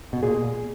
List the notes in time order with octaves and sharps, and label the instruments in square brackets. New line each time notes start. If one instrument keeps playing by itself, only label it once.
[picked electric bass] B2
[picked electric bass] A#2 [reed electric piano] G#4